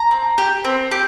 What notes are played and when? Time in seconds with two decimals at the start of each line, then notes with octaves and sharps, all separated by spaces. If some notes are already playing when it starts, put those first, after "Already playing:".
Already playing: A#5
0.11 C4
0.38 G4
0.65 C4
0.91 G4